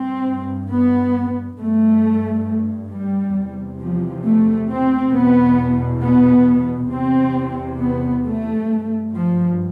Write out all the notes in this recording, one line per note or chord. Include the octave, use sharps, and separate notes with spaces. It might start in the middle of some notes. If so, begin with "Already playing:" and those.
Already playing: G2 C4
B3
G2 A3
G3
E2 C3
F3
A3
C4
E2 B2 B3
B3
E2 C3 C4
B3
A3
G2
F3